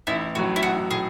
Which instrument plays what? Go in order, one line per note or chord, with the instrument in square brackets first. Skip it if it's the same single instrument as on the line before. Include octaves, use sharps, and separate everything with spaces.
[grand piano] A1 [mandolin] E4
[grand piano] A2 F#3 [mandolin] F#4
[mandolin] E4
[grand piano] A1 [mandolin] F#4
[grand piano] A2 [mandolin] G#4